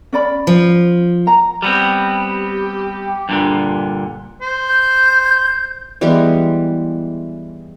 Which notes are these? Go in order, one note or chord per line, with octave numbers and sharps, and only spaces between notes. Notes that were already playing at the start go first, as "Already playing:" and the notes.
C#4 D5 B5
F3
A#5
G3 B3 C4 G4
G2 A#2 D3
C5
G6
E3 G3 G#3 B3